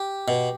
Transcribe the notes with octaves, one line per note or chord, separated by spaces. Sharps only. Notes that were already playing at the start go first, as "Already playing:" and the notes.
Already playing: G4
B2